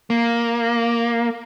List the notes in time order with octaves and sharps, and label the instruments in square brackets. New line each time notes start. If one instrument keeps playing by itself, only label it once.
[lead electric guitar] A#3